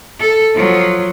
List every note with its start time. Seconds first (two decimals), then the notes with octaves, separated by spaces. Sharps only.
0.20 A4
0.55 F3 F#3